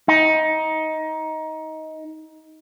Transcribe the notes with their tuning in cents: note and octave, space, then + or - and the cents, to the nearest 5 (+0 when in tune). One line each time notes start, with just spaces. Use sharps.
D#4 +20